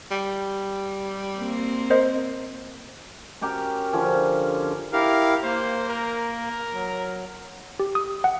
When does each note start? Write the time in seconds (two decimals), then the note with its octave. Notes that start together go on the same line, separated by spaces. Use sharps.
0.11 G3
1.39 A#3 C4
1.90 A#4 C5 D#5
3.41 C#4 F#4 G4 A#4
3.93 D3 F3 C#4
4.93 E4 G4 A#4 F5
5.43 A#3 C5
5.89 A#4
6.73 F#3
7.79 G4
7.95 D#6
8.24 F#5